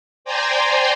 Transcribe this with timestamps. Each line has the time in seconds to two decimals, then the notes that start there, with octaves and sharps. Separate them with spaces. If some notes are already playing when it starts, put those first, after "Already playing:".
0.25 C5 D5 G5 G#5 A#5 C6